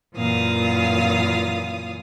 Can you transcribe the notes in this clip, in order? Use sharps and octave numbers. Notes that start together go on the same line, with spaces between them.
F#2 A#2 E3 F4 F5 D#6